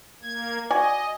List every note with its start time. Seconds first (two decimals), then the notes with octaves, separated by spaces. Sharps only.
0.22 A#3 G#6
0.70 F#4 D5 D#5 G#5